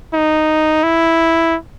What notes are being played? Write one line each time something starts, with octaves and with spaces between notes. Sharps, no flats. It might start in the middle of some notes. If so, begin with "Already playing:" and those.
D#4
E4